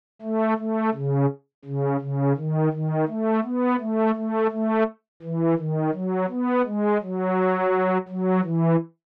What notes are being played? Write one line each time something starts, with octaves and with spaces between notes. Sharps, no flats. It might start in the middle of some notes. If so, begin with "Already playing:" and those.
A3
A3
C#3
C#3
C#3
D#3
D#3
A3
B3
A3
A3
A3
E3
D#3
F#3
B3
G#3
F#3
F#3
E3